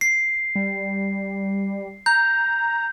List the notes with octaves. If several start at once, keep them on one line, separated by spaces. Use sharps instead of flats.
C7
G3
A#5 G6